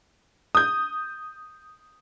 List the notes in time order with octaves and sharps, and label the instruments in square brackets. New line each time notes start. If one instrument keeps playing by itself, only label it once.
[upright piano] D#6 G6